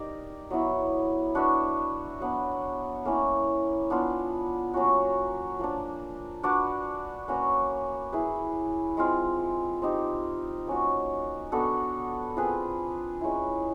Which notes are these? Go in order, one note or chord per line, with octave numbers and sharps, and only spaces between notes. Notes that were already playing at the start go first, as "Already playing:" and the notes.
Already playing: D#4 G4 A#4 D5
F#3 B3 E4
D4 F#4 B4 E5
F#3 B3 D4
A#3 C#4 E4
B3 D4 F4
F#3 A#3 C#4 F#4
F3 A#3 D4
D4 F#4 B4 D5
A#3 C#4 F#4 B4
E4 G#4 B4
G#3 C4 F4
C4 D#4 G4
A#3 C#4 F#4
B3 D4 F#4 A4
C4 F4 G#4 B4
G#3 C#4 E4